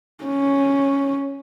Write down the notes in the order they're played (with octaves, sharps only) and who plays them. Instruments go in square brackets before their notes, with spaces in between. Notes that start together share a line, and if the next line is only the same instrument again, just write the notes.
[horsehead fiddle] C#4